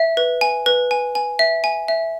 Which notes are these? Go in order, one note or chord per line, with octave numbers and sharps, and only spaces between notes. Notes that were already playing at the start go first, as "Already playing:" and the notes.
Already playing: E5
B4
G#5
B4
G#5
G#5
E5
G#5
E5